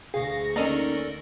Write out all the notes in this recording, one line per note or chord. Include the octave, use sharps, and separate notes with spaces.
D2 G#4 F5 C#6 A#6
D#3 A#3 C#4 D#4 A4 A#4 D5